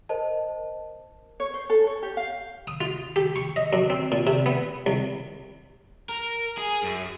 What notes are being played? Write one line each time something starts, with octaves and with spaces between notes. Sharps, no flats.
A#4 C5 D#5 A5
C#5
C5
A4
C#5
G4
F5
D#6
F4
G4
C#6
D#5
F#2
C4
A#2
C3
B3
C2
A#4
G#4
F#2